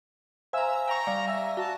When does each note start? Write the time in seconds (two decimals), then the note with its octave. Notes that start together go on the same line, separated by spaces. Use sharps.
0.53 C5 E5 F5 G#5 A#5 E6
0.87 G5 A#5 C#6
1.07 G3 D5 F5
1.28 E5 G#5 A#6
1.57 F#4 A5